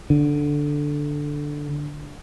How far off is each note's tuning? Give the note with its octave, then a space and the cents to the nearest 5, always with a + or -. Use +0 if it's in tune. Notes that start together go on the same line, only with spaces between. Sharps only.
D3 +0